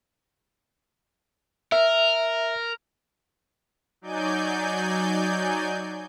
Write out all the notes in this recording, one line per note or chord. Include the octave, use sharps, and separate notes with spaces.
A#4 E5
F#3 D#4 D5 G#5 G6